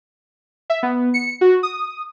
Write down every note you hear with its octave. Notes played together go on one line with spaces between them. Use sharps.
E5
B3
C#7
F#4
D#6